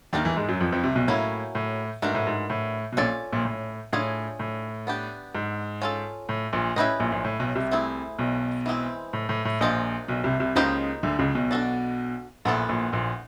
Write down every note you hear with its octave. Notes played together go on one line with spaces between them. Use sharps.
D#2 D#3 A3 D4 G4 A#4
E2 E3
G#2 G#3
F#2 F#3
F2 F3
F2 F3
C2 C3
B1 B2
A2 F#3 A#3 C#4 E4
A2
G#2 E3 A3 D4 F#4 A#4
A2
G#2
A2
B2
A#1 A#2 C#4 F4 A4 D5
A#1 A#2
A2
A2 D4 F4 G#4 C#5
A2
B3 D4 G4
G#2
C#4 F4 A4
A2
A#1 A#2
A2 C#4 E4 G4 B4 D#5
A#1 A#2
A#1 A#2
A2
B1 B2
C2 C3
A3 C4 E4 G#4
B1 B2
E3 G#3 C4 E4
A2
A2
A2
A#1 A#2 A#3 D4 G4 C5 D#5
B1 B2
C2 C3
C2 C3
C#2 C#3 A#3 D#4 G4 C5 D#5
D2 D3
C#2 C#3
B1 B2
D4 F#4 A4 D5
A#1 A#2 B3 E4 A4 D5
A#1 A#2
A#1 A#2